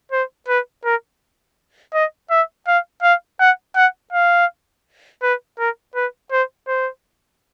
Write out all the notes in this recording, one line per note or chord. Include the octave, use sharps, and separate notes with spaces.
C5
B4
A#4
D#5
E5
F5
F5
F#5
F#5
F5
B4
A#4
B4
C5
C5